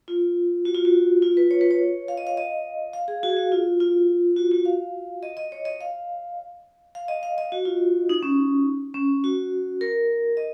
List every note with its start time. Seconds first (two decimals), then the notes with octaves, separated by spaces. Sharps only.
0.08 F4
0.65 F#4
0.74 F4
0.85 F#4
1.22 F4
1.37 B4
1.51 C#5
1.61 B4
1.71 C#5
2.08 F5
2.17 D#5
2.27 F5
2.37 D#5
2.93 F5
3.08 G#4
3.23 F#4
3.30 G#4
3.37 F#4
3.52 F4
3.80 F4
4.36 F#4
4.52 F#4
4.65 F5
5.23 D#5
5.37 D#5
5.52 C#5
5.65 D#5
5.81 F5
6.95 F5
7.08 D#5
7.23 F5
7.38 D#5
7.52 F#4
7.65 F4
8.09 D#4
8.23 C#4
8.94 C#4
9.24 F#4
9.81 A#4
10.37 D#5